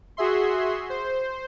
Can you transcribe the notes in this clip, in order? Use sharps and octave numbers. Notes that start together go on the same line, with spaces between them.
F#4 G#4 E5 C6
C5